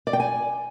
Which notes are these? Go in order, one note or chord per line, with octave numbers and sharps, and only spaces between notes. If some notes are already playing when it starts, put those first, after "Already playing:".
D5
G5
G#5